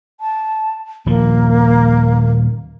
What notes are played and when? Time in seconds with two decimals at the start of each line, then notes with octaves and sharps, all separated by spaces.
0.20 A5
1.06 D#1 F3 A#3